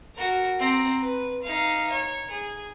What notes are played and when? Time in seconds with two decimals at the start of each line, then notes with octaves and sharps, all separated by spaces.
0.16 F#4 A#4
0.59 C4 A#5
1.02 B4
1.43 D#4 F5
1.90 C#5
2.31 G#4